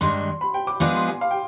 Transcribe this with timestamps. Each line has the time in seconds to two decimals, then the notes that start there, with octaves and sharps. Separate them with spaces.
0.01 G2 D#3 G#3 D4 C6
0.41 B5
0.54 G5
0.67 D6
0.80 F3 G#3 B3 D4 G#4 D6
0.95 C6
1.08 G#5
1.21 F5
1.31 G5